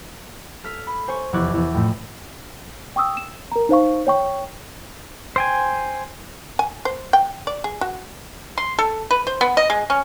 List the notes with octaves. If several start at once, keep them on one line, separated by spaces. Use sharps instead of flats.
A4 F6 B6
B5
C5 G#5 C#6
F1 E2 C#6 D6 F#6 G#6
E2
F2 A2 A3
G5 C#6 D#6 E6
E7
A#4 A#5
D#4 C5 F5 C#6
C#5 G5 C#6
C5 G5 G#5
G#5
C5
G5
D5
G#4
F#4
C6
A4
B4
C5
B3
D#5
G#3
C#4